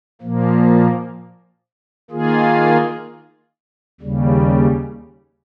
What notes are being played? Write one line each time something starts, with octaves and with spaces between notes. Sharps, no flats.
A#2 F3 A#3
D#3 A#3 F4 G#4
D#2 C#3 G3